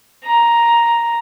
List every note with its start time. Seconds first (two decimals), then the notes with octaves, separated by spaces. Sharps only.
0.24 A#5